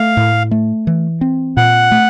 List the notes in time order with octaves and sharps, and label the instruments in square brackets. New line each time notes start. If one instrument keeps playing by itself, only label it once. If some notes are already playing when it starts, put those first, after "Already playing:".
Already playing: [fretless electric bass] A3 [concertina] F5
[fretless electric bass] A2
A3
E3
C4
[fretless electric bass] A#2 [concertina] F#5
[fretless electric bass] A3